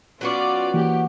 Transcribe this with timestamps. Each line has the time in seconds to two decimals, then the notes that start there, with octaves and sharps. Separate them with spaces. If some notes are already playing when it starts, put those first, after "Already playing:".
0.21 F#3 B3 C#4 F4 F#4 D5
0.74 E3 A#3 G4